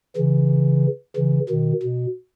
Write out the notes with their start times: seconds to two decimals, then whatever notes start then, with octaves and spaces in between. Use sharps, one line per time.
0.16 C#3 E3
1.16 C#3 E3
1.49 B2 D#3
1.83 B2